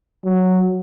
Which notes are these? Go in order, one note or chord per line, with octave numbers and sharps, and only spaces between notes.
F#3